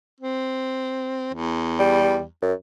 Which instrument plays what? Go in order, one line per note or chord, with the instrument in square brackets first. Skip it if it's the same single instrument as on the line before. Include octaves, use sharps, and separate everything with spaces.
[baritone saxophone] C4
E2
[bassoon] G3
F#2